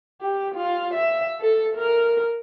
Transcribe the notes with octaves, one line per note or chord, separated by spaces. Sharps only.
G4
F4
E5
A4
A#4